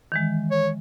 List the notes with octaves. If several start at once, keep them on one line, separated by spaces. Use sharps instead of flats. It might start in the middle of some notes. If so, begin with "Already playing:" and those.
D#3 E3 G#3
C#5